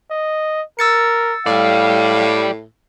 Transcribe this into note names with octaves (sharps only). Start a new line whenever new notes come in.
D#5
A#4 E6 A6 C#7
A2 G4 D5 F5